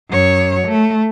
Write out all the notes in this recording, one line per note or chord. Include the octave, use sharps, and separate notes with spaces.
F#2 C#5
A3